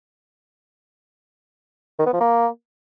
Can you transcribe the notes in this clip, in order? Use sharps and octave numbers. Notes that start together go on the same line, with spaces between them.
D#3
B3
F3
A#3